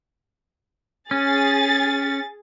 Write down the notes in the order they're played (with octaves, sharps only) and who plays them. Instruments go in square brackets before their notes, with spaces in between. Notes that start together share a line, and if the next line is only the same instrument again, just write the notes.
[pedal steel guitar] C#4 [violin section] G#4 A6